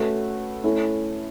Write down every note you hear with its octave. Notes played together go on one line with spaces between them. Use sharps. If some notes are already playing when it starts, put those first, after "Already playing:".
Already playing: A3 C#4 F#4 B4
A3 C#4 E4